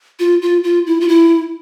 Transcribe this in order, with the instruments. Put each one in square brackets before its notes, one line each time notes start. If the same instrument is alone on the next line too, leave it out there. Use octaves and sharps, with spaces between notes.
[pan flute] F4
F4
F4
E4
F4
E4